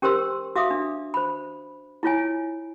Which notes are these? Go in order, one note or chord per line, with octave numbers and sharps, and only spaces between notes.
C#4 G4 A#4 C5 C6 E6
F#4 E5 F5 D6 D#6
D4
C5 B5
E4 F4 C#5 G#5